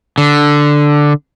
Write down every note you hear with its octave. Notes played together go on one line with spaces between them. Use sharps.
D3